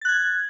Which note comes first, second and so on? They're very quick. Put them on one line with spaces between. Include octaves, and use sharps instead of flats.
A6 F#6 G#6